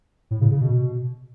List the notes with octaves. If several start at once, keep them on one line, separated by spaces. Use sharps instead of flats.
A2
C#3
C#3
B2
B2